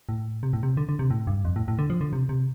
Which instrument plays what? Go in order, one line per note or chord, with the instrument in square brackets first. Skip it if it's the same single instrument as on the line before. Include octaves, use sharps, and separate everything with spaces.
[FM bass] A2
C3
A2
C3
D3
D3
C3
A2
G2
F2
A2
A2
D3
F3
D3
C3
C3